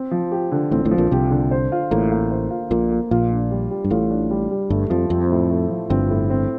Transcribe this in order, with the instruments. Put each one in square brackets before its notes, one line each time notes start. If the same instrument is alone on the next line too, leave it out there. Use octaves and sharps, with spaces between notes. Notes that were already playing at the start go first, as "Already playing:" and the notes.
Already playing: [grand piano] C4
F3
G4
D3
[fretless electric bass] A1 A2 [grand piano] C4
[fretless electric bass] A1 A2
[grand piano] F3
[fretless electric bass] A#1 A#2
[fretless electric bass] C2 C3 [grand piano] G4
[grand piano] D3
C5
F4
[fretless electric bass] A1 A2 [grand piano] A#3
[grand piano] A#3
C5
F4
[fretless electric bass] A#1 A#2 [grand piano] A#3
[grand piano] A#3
[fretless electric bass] A#1 A#2 [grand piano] F4
[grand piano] D4
G3
G3
[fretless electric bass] G2
[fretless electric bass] A1 A2 [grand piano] F4
[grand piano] D4
G3
G3
[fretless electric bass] G1 G2 [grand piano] A3
[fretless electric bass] F2 [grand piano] F3
[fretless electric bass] F2 [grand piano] C4
[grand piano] A2
A3
F3
[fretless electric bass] G1 G2 [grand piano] C4
[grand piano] A2
C4